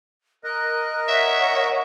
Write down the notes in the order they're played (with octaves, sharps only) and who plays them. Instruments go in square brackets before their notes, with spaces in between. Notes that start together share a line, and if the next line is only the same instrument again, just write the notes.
[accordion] A#4 D#5 [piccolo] F#6
[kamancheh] C#5 F#5 [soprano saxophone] E5 [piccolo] B6